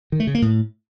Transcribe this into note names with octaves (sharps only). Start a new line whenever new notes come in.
D#3
A3
C#3
A#3
A2